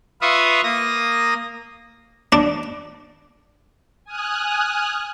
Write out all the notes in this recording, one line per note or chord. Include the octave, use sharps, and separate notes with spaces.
F4 B4 E5 F5 C#6 D#6
A#3 D#6 A#6
D4
G#5 D#6 F6 F#6